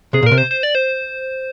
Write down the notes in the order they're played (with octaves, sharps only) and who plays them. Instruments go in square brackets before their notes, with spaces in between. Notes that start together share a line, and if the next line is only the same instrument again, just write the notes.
[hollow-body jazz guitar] C3 [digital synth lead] G#4
[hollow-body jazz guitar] A#2
[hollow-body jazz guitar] C3 [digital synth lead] A#4
[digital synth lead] C5
C5
D5
C5